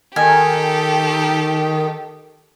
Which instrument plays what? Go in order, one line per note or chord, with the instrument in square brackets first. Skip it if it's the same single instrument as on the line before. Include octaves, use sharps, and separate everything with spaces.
[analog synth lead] D#3 [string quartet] G4 A4 [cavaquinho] G#5